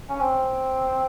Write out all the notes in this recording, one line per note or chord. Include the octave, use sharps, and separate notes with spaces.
C#4
C4